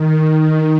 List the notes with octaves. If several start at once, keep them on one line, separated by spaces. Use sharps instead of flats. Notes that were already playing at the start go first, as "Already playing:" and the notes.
Already playing: D#3
D#3